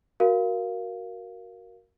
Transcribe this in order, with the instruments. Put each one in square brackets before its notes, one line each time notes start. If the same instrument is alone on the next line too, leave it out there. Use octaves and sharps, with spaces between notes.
[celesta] F#4 A#4 F5